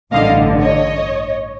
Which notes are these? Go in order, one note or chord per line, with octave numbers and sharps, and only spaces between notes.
A1 G2 D3 D#5 F5
C#5 D#5